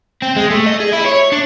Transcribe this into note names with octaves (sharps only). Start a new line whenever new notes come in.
C4
G#3
A3
D#5
G#4
E4
C#5
D4